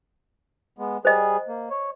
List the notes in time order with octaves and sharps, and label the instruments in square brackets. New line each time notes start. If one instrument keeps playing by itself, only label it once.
[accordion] G#3 B3
[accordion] G3 G#4 [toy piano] C5 D#5
[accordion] A#3
C#5